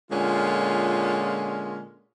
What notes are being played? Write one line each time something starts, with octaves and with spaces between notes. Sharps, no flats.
A#2 D3 G#3 C#4 F4